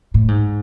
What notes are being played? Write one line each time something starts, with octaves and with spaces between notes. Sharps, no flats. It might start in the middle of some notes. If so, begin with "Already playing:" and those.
A2
G#2